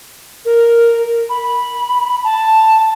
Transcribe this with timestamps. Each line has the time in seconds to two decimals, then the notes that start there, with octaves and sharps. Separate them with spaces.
0.45 A#4
1.30 B5
2.24 A5